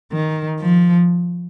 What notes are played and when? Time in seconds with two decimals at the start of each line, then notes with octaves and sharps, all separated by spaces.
0.13 D#3
0.60 F3